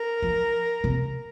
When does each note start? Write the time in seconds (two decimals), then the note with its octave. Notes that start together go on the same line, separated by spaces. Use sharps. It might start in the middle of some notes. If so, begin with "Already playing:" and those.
Already playing: A#4
0.22 F3
0.84 C3